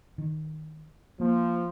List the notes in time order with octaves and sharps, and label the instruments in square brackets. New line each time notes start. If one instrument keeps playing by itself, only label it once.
[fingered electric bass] D#3
[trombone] F3 [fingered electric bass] A#3